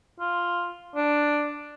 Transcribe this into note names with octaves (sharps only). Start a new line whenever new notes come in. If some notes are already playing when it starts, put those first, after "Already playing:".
F4
D4